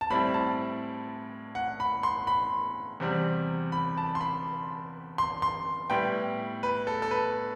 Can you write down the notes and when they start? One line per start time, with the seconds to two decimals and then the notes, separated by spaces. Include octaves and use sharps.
0.01 A5
0.10 A2 G3 C4 E4 B5
0.34 A5
1.55 F#5
1.80 B5
2.03 C6
2.27 B5
3.00 E2 C3 G3 C4
3.72 B5
3.98 A5
4.15 C6
4.21 B5
5.18 C6
5.42 C6
5.90 A2 G3 B3 E4 G5
6.63 B4
6.87 A4
7.02 A4
7.11 B4